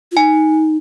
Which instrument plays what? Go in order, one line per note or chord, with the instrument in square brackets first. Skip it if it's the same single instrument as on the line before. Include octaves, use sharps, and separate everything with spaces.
[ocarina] F4
[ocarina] D#4 [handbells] G#5